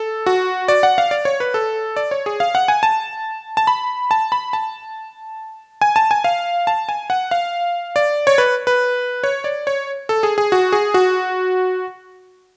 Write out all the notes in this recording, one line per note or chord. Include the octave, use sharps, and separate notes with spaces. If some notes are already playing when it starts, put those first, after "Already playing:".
Already playing: A4
F#4
D5
F#5
F5
D5
C#5
B4
A4
D5
C#5
G#4
F5
F#5
G#5
A5
A5
B5
A5
B5
A5
G#5
A5
G#5
F5
A5
G#5
F#5
F5
D5
C#5
B4
B4
C#5
D5
C#5
A4
G#4
G#4
F#4
G#4
F#4